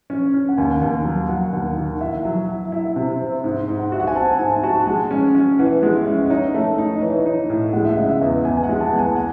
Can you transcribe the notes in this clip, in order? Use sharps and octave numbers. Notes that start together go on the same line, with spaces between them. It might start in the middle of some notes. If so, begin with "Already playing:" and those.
C#4
C#4
F#5
D#2 G#5
D#2
F#3
F#3 F#5
D#2
D#3
E4 E5
F#3
E4
E4 E5
C3
C4
G#2
G#2
F#5
F#4 E5
F#5
G#5
C4 A5
G#2 G#5
F#4 A5
G#3 G#5
C#4
C#4
E3 F#5
G#3
E5
C#4
E5
D#5
D#4 C#5
A3
D#4
D#5
E3 C#5
D#4
A2
G#3 F#5
E5
C#3 D#5
E5
E2
E2 G#5
G#5
F#5
G#3
A5
E2
G#5
F#5